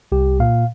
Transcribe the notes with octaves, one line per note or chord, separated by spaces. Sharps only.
C2 G4
A#2 F5